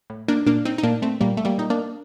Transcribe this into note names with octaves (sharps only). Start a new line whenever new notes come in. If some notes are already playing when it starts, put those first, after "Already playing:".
A2
A#3 D4
A#2 A#3 D4
C4 D#4
D#4
A#2 A#3 D4
A3 C4
A#2 G3 A#3
A3
G3 A#3
A#2 D#4
A#3 D4